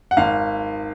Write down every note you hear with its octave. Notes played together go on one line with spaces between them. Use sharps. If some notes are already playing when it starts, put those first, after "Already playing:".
F#5
G#1 F5